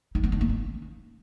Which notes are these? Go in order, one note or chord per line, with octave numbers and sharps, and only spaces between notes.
D#4
B3
D4
A#3
C#4